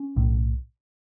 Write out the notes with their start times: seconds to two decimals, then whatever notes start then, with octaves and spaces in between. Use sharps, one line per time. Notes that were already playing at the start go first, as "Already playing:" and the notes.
Already playing: C#4
0.16 B1 A2